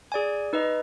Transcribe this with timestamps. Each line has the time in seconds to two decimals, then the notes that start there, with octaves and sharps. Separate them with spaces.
0.12 G#4 D5 G#5
0.53 D#4 B4 D#5